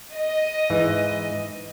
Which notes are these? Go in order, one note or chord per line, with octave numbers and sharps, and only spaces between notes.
D#5
G#2 E3